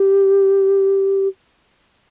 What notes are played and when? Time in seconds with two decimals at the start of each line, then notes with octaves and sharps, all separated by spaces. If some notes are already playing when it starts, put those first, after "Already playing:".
Already playing: G4